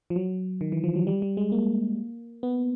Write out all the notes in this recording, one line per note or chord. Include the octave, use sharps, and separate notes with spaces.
F3
F#3
D#3
E3
F3
F#3
G3
G3
G#3
A#3
B3